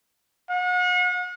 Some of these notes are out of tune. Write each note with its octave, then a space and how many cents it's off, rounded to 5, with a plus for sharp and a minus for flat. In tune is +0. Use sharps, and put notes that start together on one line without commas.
F#5 -40